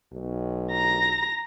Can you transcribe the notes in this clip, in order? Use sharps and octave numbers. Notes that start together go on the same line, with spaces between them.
B1
A#5 A#6